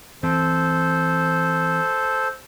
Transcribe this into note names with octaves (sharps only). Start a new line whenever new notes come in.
E3 C4 A4 C5